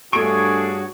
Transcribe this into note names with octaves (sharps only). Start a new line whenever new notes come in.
G2 A3 D4 F#4 G#4 C#5 C#6 D7